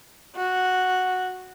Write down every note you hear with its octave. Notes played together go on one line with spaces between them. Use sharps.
F#4